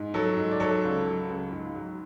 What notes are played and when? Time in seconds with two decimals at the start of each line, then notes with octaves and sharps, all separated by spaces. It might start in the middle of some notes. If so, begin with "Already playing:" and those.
Already playing: G#2
0.14 F#3 A4 C#5
0.37 G#2
0.51 D5
0.60 F#3 A4 C#5
0.84 C#2
1.06 F#3
1.30 C#2
1.52 G#2
1.75 F#3